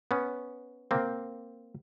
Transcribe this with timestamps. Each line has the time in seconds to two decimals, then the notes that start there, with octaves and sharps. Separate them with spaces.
0.11 B3 C#4
0.91 A#3 C4